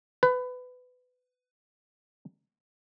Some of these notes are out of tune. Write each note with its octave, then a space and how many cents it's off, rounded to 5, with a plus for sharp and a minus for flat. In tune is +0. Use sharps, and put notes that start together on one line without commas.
B4 +20